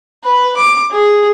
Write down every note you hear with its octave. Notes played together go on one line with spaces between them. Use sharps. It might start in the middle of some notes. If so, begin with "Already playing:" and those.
B4
D6
G#4